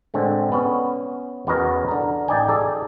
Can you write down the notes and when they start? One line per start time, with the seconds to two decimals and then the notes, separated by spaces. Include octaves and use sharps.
0.14 A2 D3 G#3 C4
0.52 B3 C#4
1.47 E2 B3 C#4 F#4 A#4 D#5
1.88 D3 A#4
2.28 A1 A#3 D#4 D5 G5 G#5
2.49 G#4 A4 D5